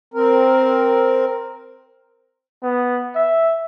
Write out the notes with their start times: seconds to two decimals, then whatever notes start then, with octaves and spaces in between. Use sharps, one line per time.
0.14 C4 A#4
2.63 B3
3.15 E5